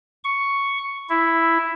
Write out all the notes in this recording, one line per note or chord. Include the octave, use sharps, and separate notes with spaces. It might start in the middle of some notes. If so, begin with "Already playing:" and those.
C#6
E4